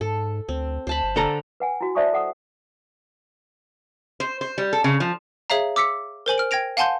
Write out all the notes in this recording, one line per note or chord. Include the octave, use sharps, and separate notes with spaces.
G#2 A4
D2 C4
D2 C5 A5 B5
G1
D3 A4 A#5
B4 F#5 G#5
E4 F#4
C5 D5 E5 A5 C#6 D#6
A4 F#5 D#6
C5
C5
G3
A4
C#3
F3
G#4 C#5 E5 F5 A#5
D6 E6 B6 C#7
A#4 C5 G#5 F#7
F6 D7
G5 G#6 A#6 D7 F7
F5 F#5 G#5 A5 C6 G6